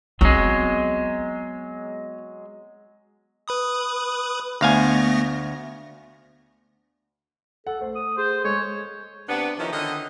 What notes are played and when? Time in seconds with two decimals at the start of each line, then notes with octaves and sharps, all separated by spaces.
0.21 F#3 G#3 B3 C4
3.48 B4 B5 D#6
4.61 D2 A3 B3 F5 G#5 A#6
7.67 A4 F#5
7.81 A3 C5
7.95 D#6
8.18 G#4 C5
8.44 G#3 A4 C#5
9.29 C3 B3 D4
9.59 D#3 F3 B3 C#4 D#4 E4
9.73 D3 D#3 C#4 D#5